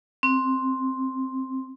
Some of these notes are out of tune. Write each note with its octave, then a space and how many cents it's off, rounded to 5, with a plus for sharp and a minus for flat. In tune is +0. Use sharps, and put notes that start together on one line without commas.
C4 +5